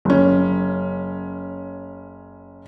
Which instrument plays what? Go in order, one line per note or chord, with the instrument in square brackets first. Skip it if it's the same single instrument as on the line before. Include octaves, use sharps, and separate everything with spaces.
[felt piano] F#1 C#4